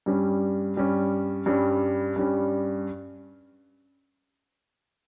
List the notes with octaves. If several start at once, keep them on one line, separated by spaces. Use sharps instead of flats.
G2 G3 C#4
G2 G3 C#4
G2 G3 C#4
G2 G3 C#4